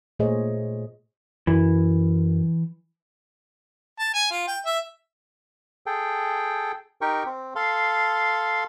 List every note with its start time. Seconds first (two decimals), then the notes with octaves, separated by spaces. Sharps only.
0.19 A#2 A3 G#4 C5 C#5 D#5
1.47 F#2 E3
3.99 A5
4.14 G#5
4.31 F4
4.48 G5
4.66 E5
5.86 G#4 A4 G5
7.01 D#4 G4 A#4 G5 C#6
7.26 C4
7.56 A4 F5 C6